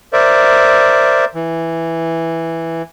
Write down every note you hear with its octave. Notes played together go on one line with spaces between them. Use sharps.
A#4 C5 D5 E5
E3